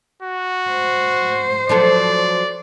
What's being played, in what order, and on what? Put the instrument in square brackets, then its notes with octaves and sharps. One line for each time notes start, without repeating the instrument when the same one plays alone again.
[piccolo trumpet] F#4
[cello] C5
[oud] F3 F#3 A4 [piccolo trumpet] D5